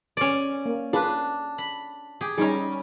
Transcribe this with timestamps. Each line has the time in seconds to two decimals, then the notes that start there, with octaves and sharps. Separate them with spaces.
0.17 C#4 D5
0.66 A#3
0.93 D4 F4 G#4 B4
1.58 B5
2.21 G4 G#4
2.38 G3 C#4 D#4 G#4